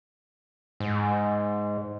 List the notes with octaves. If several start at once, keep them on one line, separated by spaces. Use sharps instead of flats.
G#2